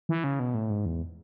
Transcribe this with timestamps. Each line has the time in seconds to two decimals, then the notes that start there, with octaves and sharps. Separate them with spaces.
0.09 E3
0.24 C#3
0.39 B2
0.54 A2
0.70 G#2
0.86 E2